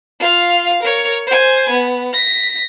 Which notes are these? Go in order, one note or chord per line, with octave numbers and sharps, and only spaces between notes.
F4 F5
A#4 C#5
C5 G#5
B3
A#6 B6